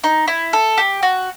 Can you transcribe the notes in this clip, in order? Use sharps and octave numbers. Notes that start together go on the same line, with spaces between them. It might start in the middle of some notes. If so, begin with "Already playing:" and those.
D#4
E4
A4
G4
F#4